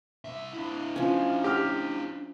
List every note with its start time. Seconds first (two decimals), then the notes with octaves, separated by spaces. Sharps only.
0.25 C2 E5
0.53 D4 E4
0.96 F3 C#4
1.44 G4 F6